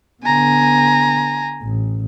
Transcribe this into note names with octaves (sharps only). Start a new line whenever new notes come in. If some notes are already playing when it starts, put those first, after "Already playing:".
D3 B3 G#5 A#5
A1